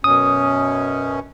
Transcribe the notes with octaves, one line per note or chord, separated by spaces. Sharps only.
F#2 B2 C#4 D#6